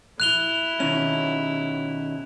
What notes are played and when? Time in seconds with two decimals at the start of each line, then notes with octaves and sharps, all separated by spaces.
0.20 E4 F#6 F7 G7
0.80 B2 D#3 C#4 F7